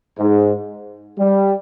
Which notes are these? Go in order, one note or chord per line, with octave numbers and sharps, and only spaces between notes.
G#2
G3